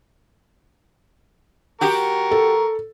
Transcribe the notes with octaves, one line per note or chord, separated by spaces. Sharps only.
F#4 G4 A#4 C#6
A4